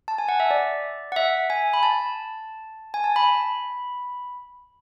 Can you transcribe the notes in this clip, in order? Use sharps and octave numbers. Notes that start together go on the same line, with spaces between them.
A5
G#5
F#5
E5
D5
F#5
E5
G#5
B5
A5
G#5
A5
B5